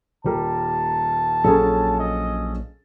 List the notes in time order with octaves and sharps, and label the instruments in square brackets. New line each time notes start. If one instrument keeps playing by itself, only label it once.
[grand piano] D#1 G3 A#4 [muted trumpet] A5
[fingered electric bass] A#1 A#2 F#3 [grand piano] C#4 G#4 A4
[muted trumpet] D#5